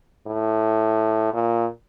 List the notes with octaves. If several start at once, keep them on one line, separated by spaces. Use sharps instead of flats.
A2
A#2